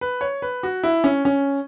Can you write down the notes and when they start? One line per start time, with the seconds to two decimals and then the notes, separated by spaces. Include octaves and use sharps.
0.01 B4
0.21 C#5
0.42 B4
0.63 F#4
0.83 E4
1.04 C#4
1.25 C#4